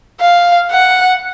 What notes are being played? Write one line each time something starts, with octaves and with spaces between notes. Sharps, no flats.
F5
F#5